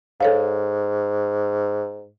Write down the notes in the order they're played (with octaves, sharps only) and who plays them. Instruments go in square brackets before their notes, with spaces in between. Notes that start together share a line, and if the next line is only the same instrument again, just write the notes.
[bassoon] G#2 [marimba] A4 C#5 F5